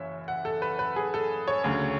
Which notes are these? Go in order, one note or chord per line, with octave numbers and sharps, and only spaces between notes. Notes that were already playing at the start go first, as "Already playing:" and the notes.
Already playing: F#1 F#2 E3 C#5 E5
F#5
A4
B4
B4
G#4
A4
C#5
D2 C#3 F#3